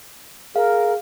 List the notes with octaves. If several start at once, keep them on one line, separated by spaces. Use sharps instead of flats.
G#4 A#4 F5